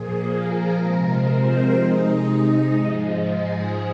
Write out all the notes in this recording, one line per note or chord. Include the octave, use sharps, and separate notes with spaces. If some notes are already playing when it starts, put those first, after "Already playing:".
Already playing: A#2 F3 A#3 G#4
A#4
C3 F3 G#3 A#4
C4 C5
C3 G#3 D#4 D#5
G#2 F3 G#3
G#4